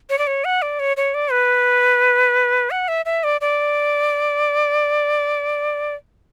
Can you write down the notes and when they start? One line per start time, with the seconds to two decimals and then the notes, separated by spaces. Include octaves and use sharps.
0.09 C#5
0.18 D5
0.27 C#5
0.45 F#5
0.62 D5
0.80 C#5
0.97 C#5
1.14 D5
1.32 B4
2.71 F#5
2.88 E5
3.06 E5
3.24 D5
3.41 D5